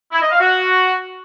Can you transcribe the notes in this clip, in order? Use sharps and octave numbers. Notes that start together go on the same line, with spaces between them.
E4
D#5
F5
F#4